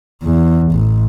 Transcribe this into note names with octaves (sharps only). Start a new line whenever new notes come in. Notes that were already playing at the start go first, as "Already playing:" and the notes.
E2
A1